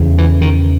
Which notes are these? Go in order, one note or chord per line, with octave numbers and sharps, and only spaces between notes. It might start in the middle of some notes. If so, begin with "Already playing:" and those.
Already playing: E2 C#3
E3
D#3